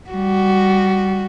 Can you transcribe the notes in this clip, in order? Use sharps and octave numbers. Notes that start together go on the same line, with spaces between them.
G3 F#4